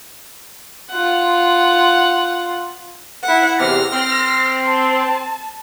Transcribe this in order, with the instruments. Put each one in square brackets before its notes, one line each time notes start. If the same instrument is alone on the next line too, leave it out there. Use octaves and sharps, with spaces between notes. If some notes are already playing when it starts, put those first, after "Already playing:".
[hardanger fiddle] F4 F#5
[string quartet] E4 F#5
[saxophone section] E2 C3 [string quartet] F6 A#6
[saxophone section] C4
[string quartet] A5